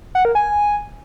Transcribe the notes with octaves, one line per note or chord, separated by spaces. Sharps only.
F#5
A#4
G#5